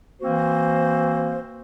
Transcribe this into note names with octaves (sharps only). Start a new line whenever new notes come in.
E3 A#3 C4 F#4 C5